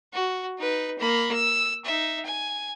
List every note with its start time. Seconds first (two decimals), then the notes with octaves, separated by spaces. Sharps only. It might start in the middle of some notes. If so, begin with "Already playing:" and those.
0.14 F#4
0.59 D#4 B4
0.99 A#3 B5
1.33 E6
1.85 D#4 E5
2.25 G#5